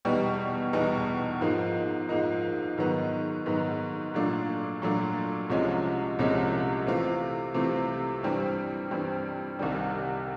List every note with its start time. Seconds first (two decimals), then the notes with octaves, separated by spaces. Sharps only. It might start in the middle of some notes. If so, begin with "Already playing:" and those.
0.05 E2 B2 G3 B3 D#4
0.73 E2 B2 G3 B3 D#4
1.41 G#2 F3 A#3 D#4
2.09 G#2 F3 A#3 D#4
2.77 G#2 D#3 F#3 B3
3.46 G#2 D#3 F#3 B3
4.14 A#2 F#3 A3 D4 F4
4.82 A#2 F#3 A3 D4 F4
5.50 C2 C3 F3 G#3 C#4
6.19 C2 C3 F3 G#3 C#4
6.87 C3 E3 A3 C4 F4
7.54 C3 E3 A3 C4 F4
8.23 G2 E3 G3 C4
8.91 G2 E3 G3 C4
9.59 C2 C3 D#3 G3